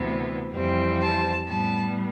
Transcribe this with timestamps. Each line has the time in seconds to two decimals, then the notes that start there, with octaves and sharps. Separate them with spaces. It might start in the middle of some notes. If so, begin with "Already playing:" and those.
Already playing: D2 C3 E3 B3
0.53 F2 E3 G3 C4
1.01 A5
1.47 A2 G3 B3 A5